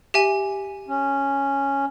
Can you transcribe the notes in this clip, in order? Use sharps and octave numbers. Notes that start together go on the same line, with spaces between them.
G4 E5 G#5
C#4